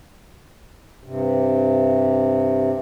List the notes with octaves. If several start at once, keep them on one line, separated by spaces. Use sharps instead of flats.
G2 C3